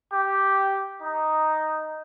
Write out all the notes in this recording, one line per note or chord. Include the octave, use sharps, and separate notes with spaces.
G4
D#4